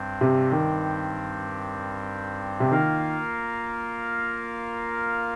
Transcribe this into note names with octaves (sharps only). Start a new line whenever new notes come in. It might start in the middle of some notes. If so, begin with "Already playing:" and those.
Already playing: G2 G3 C4
C3
D#3
C3
D#3 A#3 F4 A#4 F5